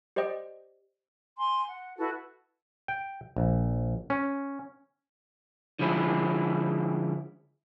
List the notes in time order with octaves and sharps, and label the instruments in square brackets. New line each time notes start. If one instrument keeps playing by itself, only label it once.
[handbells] G4 C5 D5 D#5 G5
[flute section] G#5 C6
F#5
E4 F#4 A4 B4
[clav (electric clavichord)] G5
A#1
C#4
[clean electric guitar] D3 F3 G#3 C#4 E4